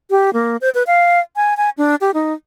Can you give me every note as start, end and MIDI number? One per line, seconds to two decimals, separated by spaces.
0.10 0.30 67
0.34 0.57 58
0.61 0.70 72
0.75 0.83 71
0.87 1.20 77
1.36 1.54 80
1.57 1.70 80
1.78 1.95 62
2.01 2.11 67
2.14 2.33 63